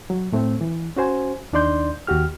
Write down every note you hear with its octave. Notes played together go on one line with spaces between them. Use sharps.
F#3
A2 A3 C4
E3
C#4 F#4 C5 G#5
D#2 D4 D#4 D5 C6 G6
D#2 F#4 G4 F6